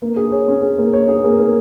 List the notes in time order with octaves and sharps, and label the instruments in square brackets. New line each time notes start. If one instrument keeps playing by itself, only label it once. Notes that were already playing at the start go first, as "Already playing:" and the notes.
[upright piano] A#3
G#4
C#5
C#4
G#4
A#3
C#5
G#4
A#3
A#3